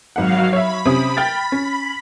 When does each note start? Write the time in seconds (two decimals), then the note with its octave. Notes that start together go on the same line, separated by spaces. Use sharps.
0.16 G#1 F#3 F5 F#5
0.53 C#5 E5 B5
0.85 C3 C#4 D#6
1.17 G5 F6 A6
1.52 C#4